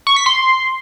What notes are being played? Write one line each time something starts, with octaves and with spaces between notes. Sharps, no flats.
C#6
B6
C6